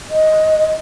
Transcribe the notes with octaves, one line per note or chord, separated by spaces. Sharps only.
D#5